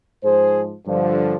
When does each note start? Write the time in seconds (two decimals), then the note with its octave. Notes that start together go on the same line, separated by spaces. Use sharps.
0.24 G#2 F3 G#4 C5
0.87 G2 D3 F3